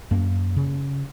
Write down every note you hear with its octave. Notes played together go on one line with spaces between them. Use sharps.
F#2 A#3
C#3